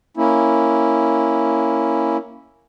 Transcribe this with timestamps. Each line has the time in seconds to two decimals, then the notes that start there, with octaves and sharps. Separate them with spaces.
0.17 A#3 C#4 E4